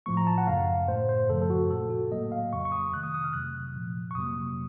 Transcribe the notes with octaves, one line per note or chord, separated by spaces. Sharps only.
A2 F3 A3 C#6
A#5
A5
F#5
F#2 C#3 A3 F5
A2 A3 C5
C5
F#2 C#3 F3 A4
A4
F#4
A#2 A3 A4
F#4
A2 F#3 A#3 D#5
F5
F2 C#3 F#3 C#6
C#6
D#6
C3 D#3 A3 F#6
D#6
D#6
F6
F2 C3 F#3 F#6
A#2 F3 A3
C#6
F2 C3 F#3 A#3 D#6